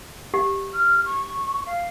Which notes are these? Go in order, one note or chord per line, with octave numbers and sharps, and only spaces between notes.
G4
F6
C#6
F5